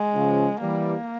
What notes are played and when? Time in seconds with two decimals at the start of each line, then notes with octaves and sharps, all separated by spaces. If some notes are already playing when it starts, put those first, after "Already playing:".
Already playing: G#3
0.14 C#3 F3
0.61 E3 G3 A#3